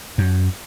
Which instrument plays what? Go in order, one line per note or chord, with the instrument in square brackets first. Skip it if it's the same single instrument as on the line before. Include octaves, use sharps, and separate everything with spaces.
[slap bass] F#2